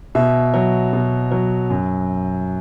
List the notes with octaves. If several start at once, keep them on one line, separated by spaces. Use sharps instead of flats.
B2 E5
F#3
B2
F#3
F#2